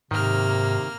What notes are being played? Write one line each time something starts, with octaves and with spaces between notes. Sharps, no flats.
G#2 C3 D#3 A#3 F6